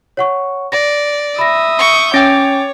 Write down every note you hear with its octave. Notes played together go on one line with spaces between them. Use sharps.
C#5 F#5 C#6
D5 A#6
E5 B5 D#6 A#6
C#6 G6
C#4 C#5 G5 D6 A6